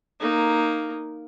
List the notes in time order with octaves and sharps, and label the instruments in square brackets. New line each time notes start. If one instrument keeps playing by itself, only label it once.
[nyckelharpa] A#3 D#4